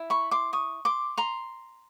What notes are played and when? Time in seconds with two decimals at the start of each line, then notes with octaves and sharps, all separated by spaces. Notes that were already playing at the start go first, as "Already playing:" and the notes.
Already playing: E4
0.10 B5 C#6
0.31 C6 D6
0.53 C#6 D#6
0.85 C6 D6
1.18 A#5 C6